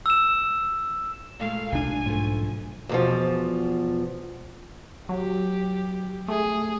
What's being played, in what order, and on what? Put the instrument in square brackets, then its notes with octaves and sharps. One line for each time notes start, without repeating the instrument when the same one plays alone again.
[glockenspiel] E6 E7
[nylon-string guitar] A#2 G#3 A3 [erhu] F5
[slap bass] B1 D4 [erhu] G#5
[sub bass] G#2 [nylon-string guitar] F3 A3
[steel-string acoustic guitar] E2 B2 F3
[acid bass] F#3 [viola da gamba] G4
[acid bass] A3 [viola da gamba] G#4